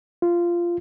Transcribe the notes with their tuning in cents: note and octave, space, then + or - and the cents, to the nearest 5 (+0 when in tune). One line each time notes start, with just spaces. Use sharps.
F4 -15